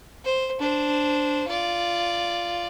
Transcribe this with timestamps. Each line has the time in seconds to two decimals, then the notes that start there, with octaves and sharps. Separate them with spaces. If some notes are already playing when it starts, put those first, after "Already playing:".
0.25 C5
0.59 D4 C5
1.48 F4 D5